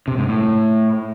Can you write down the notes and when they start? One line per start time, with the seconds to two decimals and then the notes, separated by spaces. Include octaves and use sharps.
0.08 C3
0.18 G#2
0.28 A2